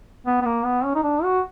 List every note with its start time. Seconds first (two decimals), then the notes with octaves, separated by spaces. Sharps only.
0.26 B3
0.41 B3
0.45 A#3
0.65 B3
0.84 C#4
0.95 D#4
1.03 D4
1.23 F#4